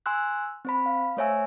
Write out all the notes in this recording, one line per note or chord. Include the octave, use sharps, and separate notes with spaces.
G#5 C6 E6 F#6
C4 C5 B5
F5
A3 C5 C#5 E5 G#5 E6